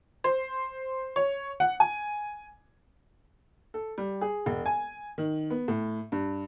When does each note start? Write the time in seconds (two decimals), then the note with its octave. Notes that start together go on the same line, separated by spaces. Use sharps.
0.24 C5
1.16 C#5
1.60 F#5
1.80 G#5
3.74 A4
3.98 G3
4.21 G#4
4.46 E1
4.66 G#5
5.18 D#3
5.50 B3
5.68 A2
6.12 G2